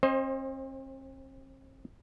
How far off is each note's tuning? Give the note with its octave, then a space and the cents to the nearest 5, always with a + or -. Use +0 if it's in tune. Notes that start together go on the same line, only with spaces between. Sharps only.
C4 +40 C5 +20 D#5 +0